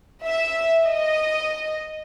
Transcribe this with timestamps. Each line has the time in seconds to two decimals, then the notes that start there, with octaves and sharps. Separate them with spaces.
0.24 E5
0.86 D#5